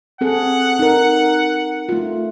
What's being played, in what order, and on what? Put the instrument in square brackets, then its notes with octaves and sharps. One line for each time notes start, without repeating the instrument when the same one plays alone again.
[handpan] C4 G#4 A4 [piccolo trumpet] F#5
[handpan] D#4 A#4
A3 F4